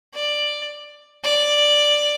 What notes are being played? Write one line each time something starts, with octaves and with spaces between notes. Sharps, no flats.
D5
D5